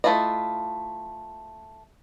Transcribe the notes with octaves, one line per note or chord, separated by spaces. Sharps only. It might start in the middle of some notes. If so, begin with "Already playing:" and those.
A3 C4 E4 F4 D#5